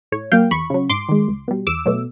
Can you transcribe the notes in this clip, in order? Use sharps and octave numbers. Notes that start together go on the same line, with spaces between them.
A2 C#5
F#3 A#3 F5 G5
E2 B5 C#6
C#3 F#3
G#2 C6 D6
D#3 G#3
C#2
B2 G3
E2 D6 E6
B2 F#3 A3